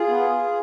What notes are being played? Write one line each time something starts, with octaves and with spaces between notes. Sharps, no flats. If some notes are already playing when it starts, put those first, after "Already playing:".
Already playing: F4 G#4
B3